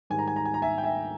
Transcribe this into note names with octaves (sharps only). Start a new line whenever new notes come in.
G#2 D#3 G3 G#5
A#5
G#5
A#5
G#5
A#5
E5 G#5
G5
E5 G#5